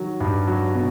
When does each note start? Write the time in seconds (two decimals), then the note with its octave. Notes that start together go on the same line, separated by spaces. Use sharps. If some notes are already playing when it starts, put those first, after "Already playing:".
Already playing: D#3 F#3
0.20 G2
0.47 F#3
0.75 B2